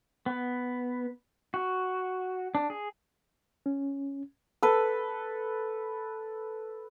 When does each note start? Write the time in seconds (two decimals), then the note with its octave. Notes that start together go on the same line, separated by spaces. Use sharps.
0.26 B3
1.54 F#4
2.55 D4
2.70 G#4
3.66 C#4
4.63 A4 B4